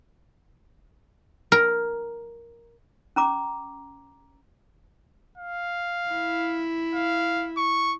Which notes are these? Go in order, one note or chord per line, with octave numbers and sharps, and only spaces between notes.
A#4
C#4 A#5 D6
F5
E4
F5
C#6